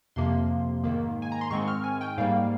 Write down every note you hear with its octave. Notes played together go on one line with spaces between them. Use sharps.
F2 C3 F3 A#3 C6
G#2 D#3 A#3
G#5
A#5
C6
G#2 D#3 G#3 C4 C#6
F6
G#5
G5
G#2 G3 A#3 F5